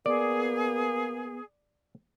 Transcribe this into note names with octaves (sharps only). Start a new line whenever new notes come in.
A#3 B3 G#4 D5